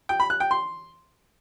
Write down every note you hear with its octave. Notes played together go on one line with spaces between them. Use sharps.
G5
B5
F#6
G5
C6